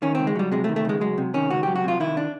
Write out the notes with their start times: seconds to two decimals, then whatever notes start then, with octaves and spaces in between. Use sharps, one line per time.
0.02 D#3 C#4
0.15 C#2 C4
0.27 G#3
0.35 F#3 G3
0.52 C3 G#3
0.64 A3
0.69 D#3
0.76 A3
0.85 C#2 G#3
1.01 F#3 G#3
1.18 C3
1.34 D#3 C#4
1.50 C#2 F#4
1.63 F#3 G4
1.76 F#4
1.84 C3 F4
2.00 D#3 E4
2.17 D4